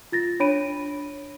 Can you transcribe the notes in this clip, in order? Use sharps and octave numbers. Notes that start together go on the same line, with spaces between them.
F4 A6 A#6
D4 C#5 B5 D7 D#7